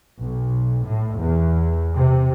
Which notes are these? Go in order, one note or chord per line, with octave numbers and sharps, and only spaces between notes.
B1
A2
E2
C3